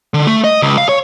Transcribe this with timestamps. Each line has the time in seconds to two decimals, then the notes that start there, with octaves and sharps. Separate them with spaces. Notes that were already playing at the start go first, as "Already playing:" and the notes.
0.14 D3
0.27 A3
0.44 D#5
0.62 C#2
0.78 F5
0.89 C#5